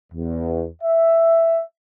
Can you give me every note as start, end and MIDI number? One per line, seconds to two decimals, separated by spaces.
0.12 0.67 40
0.82 1.62 76